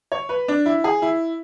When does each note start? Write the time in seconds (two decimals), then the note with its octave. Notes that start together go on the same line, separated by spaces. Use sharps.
0.12 C#5
0.29 B4
0.48 D4
0.66 E4
0.84 G#4
1.02 E4